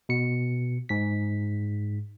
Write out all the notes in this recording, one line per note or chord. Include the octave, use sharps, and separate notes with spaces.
B2 C#7
G#2 B6